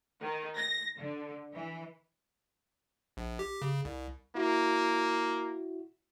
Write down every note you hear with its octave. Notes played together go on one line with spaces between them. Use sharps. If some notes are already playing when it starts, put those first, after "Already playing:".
D#3
A#6
D3
E3
A#1
G4
C#3
C2
A#3 E4 F#4